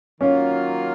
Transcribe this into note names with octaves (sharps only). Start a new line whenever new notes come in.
D#3 F#3 A#3 C#4 F4